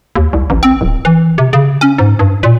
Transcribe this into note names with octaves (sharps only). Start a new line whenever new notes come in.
D#2
C2
A1
C4
D1
E3
C3
C#3
C#4
G#2
G2
A#2